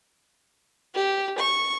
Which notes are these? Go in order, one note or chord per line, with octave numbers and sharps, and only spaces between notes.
G4
C#6